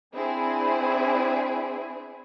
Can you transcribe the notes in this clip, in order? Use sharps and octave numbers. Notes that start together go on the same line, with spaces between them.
C4 D4 E4 G#4